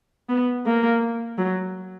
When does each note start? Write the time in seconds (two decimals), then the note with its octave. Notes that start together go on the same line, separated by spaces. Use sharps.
0.29 B3
0.66 A#3
1.38 F#3